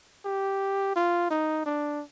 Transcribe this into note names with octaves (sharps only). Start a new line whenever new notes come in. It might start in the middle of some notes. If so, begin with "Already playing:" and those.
G4
F4
D#4
D4